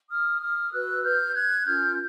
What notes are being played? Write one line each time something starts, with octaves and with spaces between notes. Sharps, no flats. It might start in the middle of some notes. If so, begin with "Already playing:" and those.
D#6 F6
D#6 F6
F#4 B4 E6 F#6
F6 G6
F#6 G#6
C#4 F4 A#4 F6 G6